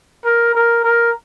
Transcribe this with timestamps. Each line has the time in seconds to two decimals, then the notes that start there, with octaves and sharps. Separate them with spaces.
0.25 A#4
0.55 A#4
0.84 A#4